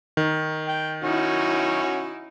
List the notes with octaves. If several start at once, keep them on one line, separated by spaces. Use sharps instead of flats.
D#3
G5
C#4 D#4 E4 F#4